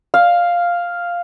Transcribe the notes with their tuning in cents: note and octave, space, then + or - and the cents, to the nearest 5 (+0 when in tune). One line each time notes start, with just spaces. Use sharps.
F5 +0